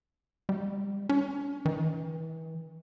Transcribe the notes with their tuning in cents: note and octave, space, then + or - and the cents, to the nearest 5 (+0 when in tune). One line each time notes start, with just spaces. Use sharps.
G3 +30
C#4 +45
E3 -35